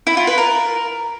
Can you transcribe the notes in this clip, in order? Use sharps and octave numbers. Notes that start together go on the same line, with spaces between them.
E4
F4
B4
A#4